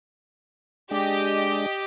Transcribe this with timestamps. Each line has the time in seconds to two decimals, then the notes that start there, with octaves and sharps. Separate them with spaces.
0.91 G#3 D4 G4 D#5